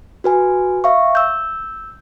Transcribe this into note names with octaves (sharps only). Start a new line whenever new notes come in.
F#4 B4 G#5
E5 F5 C#6
E6 G6